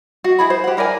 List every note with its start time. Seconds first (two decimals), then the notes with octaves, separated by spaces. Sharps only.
0.24 F#4
0.39 E4 G#4 B5
0.50 C5
0.64 G4 F#5
0.77 E4 A#4 D5 G#5